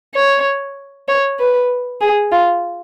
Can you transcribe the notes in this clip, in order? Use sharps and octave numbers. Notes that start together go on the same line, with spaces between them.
C#5
C#5
B4
G#4
F4